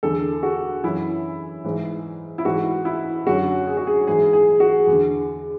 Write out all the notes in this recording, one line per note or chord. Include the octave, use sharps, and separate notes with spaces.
E2 D3 A4
F#4
F#2 E3 E4
G#2 E3
E4
G#2 E3 F#4
E4
F#2 D3 F#4
G#4
F#4
G#4
G#2 E3 G#4
G#4
F#4
E2 D3